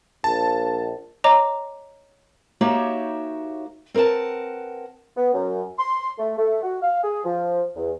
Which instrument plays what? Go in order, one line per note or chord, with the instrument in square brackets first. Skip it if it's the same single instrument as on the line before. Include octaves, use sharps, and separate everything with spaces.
[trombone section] A#1 [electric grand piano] A5
[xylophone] C#5 D#5 A#5 D6
[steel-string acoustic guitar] A#3 D#4 F#4 G4 C#5 E5
C4 A#4 B4 F#5 A5
[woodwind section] B3
F#2
C6
A3
A3
F#4
F5
G#4
F3
E2